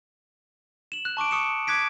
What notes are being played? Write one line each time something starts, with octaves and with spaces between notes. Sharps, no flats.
E7 F#7
F#6
A5 C#6 D6 D7
C#6 D#6 C#7 D7 E7
D6 F#6 G#6 B6 D7